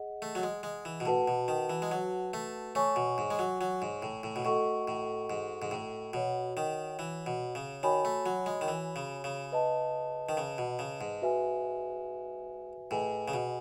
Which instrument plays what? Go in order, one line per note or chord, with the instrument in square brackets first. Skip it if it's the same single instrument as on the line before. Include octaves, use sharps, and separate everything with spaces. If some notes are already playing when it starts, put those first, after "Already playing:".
Already playing: [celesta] G#4 D#5 F#5
[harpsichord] A3
F#3
G#3
G#3
E3
B2
[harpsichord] A2 [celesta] F#4 B4 F#5 A5
[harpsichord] B2
D#3
E3
G#3
F#3
A3
[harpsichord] A3 [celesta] C#5 G#5 C#6
[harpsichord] B2
G#2
G#3
F#3
F#3
G#2
A2
A2
B2
[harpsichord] A2 [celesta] F#4 A4 D#5 F#5 C#6
[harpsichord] A2
G#2
G#2
A2
[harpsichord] B2 [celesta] F#4 C#5 F#5
[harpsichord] D#3
E3
B2
C#3
[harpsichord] D#3 [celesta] F#4 C#5 G#5 B5
[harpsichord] A3
F#3
G#3
D#3
E3
C#3
C#3
[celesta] B4 D#5 A5
[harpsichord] D#3
C#3
B2
C#3
G#2
[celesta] F#4 B4 E5 G#5
[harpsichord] A2 [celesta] G#4 B4 D#5 G#5
[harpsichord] C#3
B2